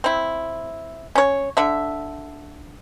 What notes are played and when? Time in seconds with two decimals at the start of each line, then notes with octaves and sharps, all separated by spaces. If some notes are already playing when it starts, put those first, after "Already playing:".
0.04 C4 E4
1.15 C#4 C#5
1.57 D3 E5